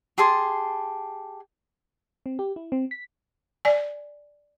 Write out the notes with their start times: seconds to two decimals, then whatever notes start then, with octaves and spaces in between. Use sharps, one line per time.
0.18 G4 G#4 A5 C6
2.26 C4
2.39 G4
2.56 E4
2.72 C4
2.91 B6
3.65 D5 G#5